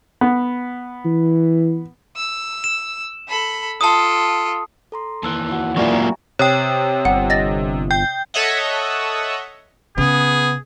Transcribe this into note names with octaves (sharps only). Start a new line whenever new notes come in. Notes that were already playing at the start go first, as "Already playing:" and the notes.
B3
E3
E6
E7
A4 B5
F4 A4 A5 D#6
A4 A#5 C6
D#2 E3 A5 E6 F#6
E4 F#4
F#3 G3 A#3 F4 E5 G#5 C#6
A#5
C3 C#5 G5 D#6
G1 F#5
D#5 A6 A#6
G5 G6
A4 C#5 D#5 E5 F#5
C#3 B3 G#4